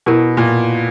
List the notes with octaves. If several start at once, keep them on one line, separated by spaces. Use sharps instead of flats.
B2 E4 G4 A#4
A#2